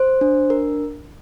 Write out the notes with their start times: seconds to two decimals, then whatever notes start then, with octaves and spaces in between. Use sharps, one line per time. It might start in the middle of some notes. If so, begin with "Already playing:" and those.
Already playing: C5
0.21 D4
0.50 A#4